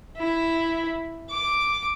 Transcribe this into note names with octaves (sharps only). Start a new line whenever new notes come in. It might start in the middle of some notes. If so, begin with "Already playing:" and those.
E4
D6